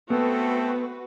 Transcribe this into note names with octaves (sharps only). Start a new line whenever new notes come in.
A3 B3 C4 F#4 A4 B4